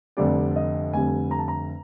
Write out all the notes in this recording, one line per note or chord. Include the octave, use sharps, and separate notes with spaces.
F1 F2 D3 G3 D5
D#5
F1 F2 D3 G3 G#5
A#5
A5
A#5